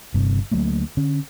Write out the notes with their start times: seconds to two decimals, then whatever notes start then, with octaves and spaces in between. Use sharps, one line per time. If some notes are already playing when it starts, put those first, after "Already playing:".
0.14 G1 G2 C3
0.51 D2 F#3 A3 A#3
0.97 D3 C#4